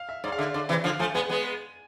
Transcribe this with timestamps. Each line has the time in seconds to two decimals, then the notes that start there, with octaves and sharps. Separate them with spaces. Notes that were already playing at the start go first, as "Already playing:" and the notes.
Already playing: F5
0.09 E5
0.24 G#2 D5
0.32 F5
0.38 D3 E5
0.54 D3 D5
0.69 C3 E3 E5
0.84 D3 F3 F5
0.99 F3 A3 G#5
1.14 G#3 B3 G#5
1.29 G#3 B3